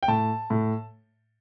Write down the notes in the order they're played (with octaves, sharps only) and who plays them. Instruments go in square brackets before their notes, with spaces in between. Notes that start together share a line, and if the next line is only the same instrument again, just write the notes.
[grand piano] G5
A2 A5
A2